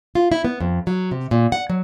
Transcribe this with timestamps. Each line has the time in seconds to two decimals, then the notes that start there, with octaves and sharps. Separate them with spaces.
0.15 F4
0.32 E4
0.44 B3
0.60 F2
0.87 F#3
1.11 C3
1.31 A#2
1.52 F#5
1.70 F#3